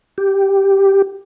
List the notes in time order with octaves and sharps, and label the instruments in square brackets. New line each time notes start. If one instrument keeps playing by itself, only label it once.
[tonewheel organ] G4